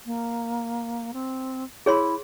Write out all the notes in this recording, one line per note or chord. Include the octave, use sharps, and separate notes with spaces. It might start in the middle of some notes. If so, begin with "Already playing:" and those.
A#3
C4
E4 G#4 C#5 C6